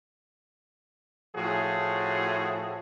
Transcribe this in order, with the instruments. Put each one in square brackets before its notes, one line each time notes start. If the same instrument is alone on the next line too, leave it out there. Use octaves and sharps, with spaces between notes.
[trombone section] A2 F3 F#4 G#4